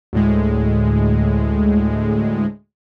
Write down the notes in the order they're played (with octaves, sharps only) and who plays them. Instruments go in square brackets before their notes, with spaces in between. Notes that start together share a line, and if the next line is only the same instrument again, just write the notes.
[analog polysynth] D2 A2 G#3